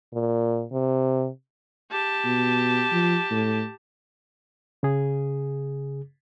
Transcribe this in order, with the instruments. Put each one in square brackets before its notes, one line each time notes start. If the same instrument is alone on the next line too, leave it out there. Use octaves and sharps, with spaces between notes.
[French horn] A#2
C3
[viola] G4 A5
[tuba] B2
F3
A2
[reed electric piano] C#3 G#4